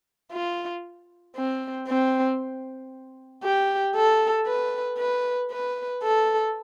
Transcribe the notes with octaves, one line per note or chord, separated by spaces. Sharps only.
F4
C4
C4
G4
A4
B4
B4
B4
A4